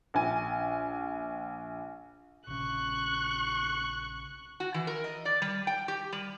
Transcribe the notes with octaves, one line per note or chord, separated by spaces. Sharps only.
A#1 G#5
A#1 C#3 C#6 F#6
F#4
E3
A#4
D#5
D5
G3
G5
G4
G3